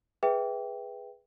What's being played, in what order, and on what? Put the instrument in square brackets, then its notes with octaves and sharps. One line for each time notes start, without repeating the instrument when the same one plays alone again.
[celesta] G#4 B4 E5 G5